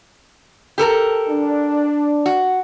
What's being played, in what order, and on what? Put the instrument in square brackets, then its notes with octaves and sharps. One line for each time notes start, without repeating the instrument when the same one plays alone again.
[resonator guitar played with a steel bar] G4 A4 A#4
[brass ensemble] D4
[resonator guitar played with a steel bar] F#4